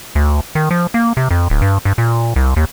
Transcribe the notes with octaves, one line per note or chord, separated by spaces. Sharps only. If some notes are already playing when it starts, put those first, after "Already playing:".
D2
D#3
F3
A#3
C3
F2
D1
G2
G2
A#2
C2
D#2